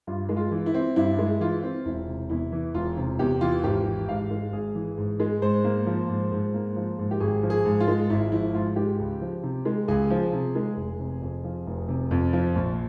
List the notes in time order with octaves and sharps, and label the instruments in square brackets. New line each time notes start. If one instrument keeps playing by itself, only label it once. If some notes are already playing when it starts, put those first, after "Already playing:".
[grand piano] G2 F4
G#3
F4
E3
E4
C4
G2 E4
G#3
E3 F4
C4
E1 E4
C3
E2 E4
E3
E1 F4
C3
E2 G4
E3 F4
G#1 G4
E3
G#2 F5
G#3
G#1 G#4
E3
G#2
G#3
G#2 C5
A#3
F3
G#2
G#2
A#3
F3
G#2
G4
G#1 G#4
F3
G#4
G#2
F4
G#3
G#1 E4
F3 E4
G#2 F4
G#3 G4
C#2
F3
C3
G#3
C#2 G#4
F3
C3
G#3
F1
C3
F2
F3
F1
C3
F2
F3
A#1